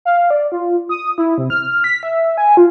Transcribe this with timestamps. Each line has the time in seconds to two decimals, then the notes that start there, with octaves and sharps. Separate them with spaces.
0.05 F5
0.30 D5
0.52 F4
0.89 D#6
1.18 E4
1.38 C3
1.50 F6
1.84 B6
2.03 E5
2.37 G#5
2.57 F4